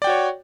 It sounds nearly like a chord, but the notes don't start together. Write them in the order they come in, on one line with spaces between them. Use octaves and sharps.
D5 G5 F#4 C#5